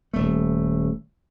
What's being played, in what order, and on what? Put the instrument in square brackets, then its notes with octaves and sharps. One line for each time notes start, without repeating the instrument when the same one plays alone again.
[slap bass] D#1 A3